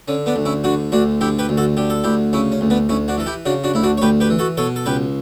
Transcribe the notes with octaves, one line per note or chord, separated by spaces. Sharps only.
D3 C#4
B3 D4
D2
C#4 E4
D3 D4 F#4
D2 D4 F#4
D3 E4 G4
G4 B4
D2
F#4 A4
D3 G4
A4
D2 E4 G4
C#3 C#4 E4
C#4
D2
B3 D4
D2 C#4 E4
D4 F#4
E3 A4
E4 G4
C#3 D4 F#4
D4 F#4
D2 E4
D4 F#4
C#5
D2 G4 B4
G4 B4
E3
F#4 A4
B2 A4 C#5
A4
C#2 G4 B4